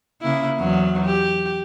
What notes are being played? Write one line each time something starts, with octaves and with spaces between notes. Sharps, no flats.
C#3 A#3 E4
E2 F#3
G4